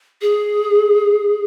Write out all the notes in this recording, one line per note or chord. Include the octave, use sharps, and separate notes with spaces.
G#4